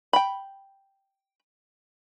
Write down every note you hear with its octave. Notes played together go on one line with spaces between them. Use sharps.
G5 B5